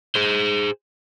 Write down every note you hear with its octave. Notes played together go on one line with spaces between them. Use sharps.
G#4 C5